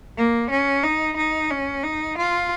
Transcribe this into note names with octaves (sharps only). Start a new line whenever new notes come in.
A#3
C#4
D#4
D#4
C#4
D#4
F4